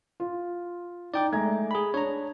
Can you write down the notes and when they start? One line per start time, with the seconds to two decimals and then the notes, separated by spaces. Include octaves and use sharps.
0.20 F4
1.14 D#4 D5 G5 D6
1.33 G#3 A3 A#5 G#6
1.71 G#4 B5
1.94 D4 C#5 A#5